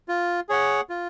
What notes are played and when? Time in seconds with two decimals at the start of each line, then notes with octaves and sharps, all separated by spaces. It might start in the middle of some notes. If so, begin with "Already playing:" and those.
0.08 F4
0.49 G#4 C#5 F#5
0.90 F4